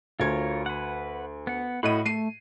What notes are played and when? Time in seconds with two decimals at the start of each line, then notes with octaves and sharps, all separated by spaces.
0.20 D2 F4 A#4 C#5 G#6
0.66 B4 F#5
1.47 B3 F#5
1.83 A2 F#4 D#5 B5 D#7
2.06 A3 C7 D#7